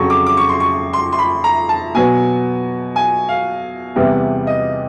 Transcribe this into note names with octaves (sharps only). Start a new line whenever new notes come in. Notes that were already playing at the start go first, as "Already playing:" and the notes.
Already playing: F2 C#3 F#3 C#6
D6
D6
C#6
C6
C#6
C6
C6
B5
A#5
A5
B2 F#3 B3 G#5
G#5
F5
E2 C3 E3 G3 B3
D#5